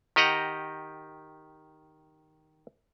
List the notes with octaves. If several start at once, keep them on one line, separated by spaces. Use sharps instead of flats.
D#3 G4 D#5 F#5 A#5